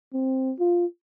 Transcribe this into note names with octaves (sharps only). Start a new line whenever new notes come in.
C4
F4